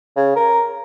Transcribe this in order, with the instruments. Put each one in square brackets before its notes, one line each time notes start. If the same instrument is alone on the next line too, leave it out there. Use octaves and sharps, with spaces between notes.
[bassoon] C#3
A#4